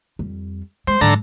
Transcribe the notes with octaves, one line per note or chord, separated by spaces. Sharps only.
F2 G3
G#3 C5
G#2 D3 F#3 A4 A#5